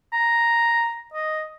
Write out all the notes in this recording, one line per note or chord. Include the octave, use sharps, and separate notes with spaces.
A#5
D#5